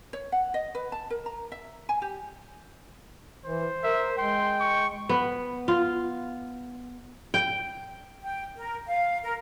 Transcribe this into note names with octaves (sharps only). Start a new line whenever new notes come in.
C#5
F#5
D#5
B4
A5
A#4
A#5
E5
G#5
G4
E3 C5
A#4 E5
G#3 G5 C6
C#6
B3
F4
G5
G5
A#4
F5
A#4